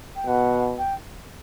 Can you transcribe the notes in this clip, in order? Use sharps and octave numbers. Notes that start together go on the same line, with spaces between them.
G5
B2 F#5
G5